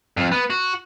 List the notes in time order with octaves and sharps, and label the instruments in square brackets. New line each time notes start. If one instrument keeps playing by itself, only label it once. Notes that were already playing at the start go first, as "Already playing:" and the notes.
[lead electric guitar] F2
B3
F#4